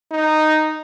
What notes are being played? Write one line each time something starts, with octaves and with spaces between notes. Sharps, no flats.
D#4